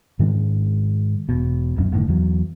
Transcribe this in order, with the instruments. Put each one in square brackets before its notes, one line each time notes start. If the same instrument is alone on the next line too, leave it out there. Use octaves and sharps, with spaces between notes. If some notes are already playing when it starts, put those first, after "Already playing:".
[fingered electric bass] G#2 D#3 G#3 C#4
E1 B2
D#1 F#2 C#4
F#1 A2 D#3
E2 F#3